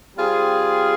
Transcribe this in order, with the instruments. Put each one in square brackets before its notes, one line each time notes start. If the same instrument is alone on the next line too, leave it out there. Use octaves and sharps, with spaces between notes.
[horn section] G3 C4 F4 G#4